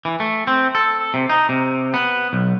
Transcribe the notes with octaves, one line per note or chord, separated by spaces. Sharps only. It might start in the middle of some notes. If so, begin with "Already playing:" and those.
E3
A3
C4
A4
C3
D#4
C3
B3
B1